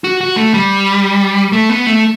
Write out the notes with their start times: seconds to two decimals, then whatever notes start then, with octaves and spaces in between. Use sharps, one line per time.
0.04 F#4
0.21 F#4
0.36 A3
0.54 G3
1.52 A3
1.70 B3
1.86 A3